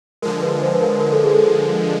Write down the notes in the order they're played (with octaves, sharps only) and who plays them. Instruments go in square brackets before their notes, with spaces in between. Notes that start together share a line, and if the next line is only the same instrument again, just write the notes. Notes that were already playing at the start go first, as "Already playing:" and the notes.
[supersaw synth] D3 F3 G#3 [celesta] A#4
[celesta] B4
C5
B4
A#4
A#4
A4
G#4
A4